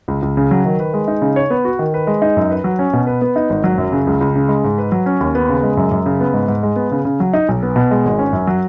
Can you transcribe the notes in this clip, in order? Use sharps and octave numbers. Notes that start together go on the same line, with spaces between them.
C#2
C#2
C#3
F#3
D#3
B4
G#3
D#4
C#3
C#5
B3
F#4
D#3
B4
G#3
D#4
F#2
B4
F#3
C#4
B2
B4
B3
D#4
G#1
F#3
F#2
C#3
C#2
C#2
C#3
G#3
G#2
B4
F#3
C#4
D#2
B3
C#3
G#3
F#2
F#2
C#3
B3
G#2
G#2
G#3
B3
C#3
C#3
F#3
D#4
B1
B3
B2
G#3
G#1
C#4
F#2
F#3